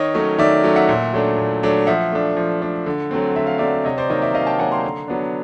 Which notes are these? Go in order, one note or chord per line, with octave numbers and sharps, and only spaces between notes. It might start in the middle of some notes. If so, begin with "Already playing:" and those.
Already playing: D#3 C#5 D#5
F#3 A3 C#4
D#3 D5 E5
F#3 A3 C#4
E5 F#5
A#2
F#3 A3 D4
A#2
F#3 A3 D4
F3 E5 F#5
A3 D4
F3
A3 D4
D3
F#3 A3 C4
D3 E5
F5
F#3 A3 C4 D5 E5
C3 C#5 D#5
C5 D5
D#3 F#3 A#3 C#5 D#5
D5 E5
C3 D#5 F5
G5 A5
D#3 F#3 A#3 F#5 G#5
A#5 C6
D3
F#3 B3 D4